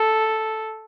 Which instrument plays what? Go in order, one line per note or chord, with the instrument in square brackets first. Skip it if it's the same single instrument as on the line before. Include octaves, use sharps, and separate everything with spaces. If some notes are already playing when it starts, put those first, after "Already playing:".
Already playing: [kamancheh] A4